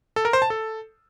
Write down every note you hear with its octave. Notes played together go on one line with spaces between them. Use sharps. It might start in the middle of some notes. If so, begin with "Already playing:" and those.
A4
A#4
C5
A5
A4